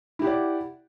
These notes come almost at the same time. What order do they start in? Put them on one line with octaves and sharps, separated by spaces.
E4 G4 F#5 D5